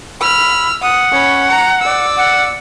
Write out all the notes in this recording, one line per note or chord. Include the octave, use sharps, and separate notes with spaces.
B5 E6 F6
F#5 D#6
C#4 B5
A#5
D5 E6
F#5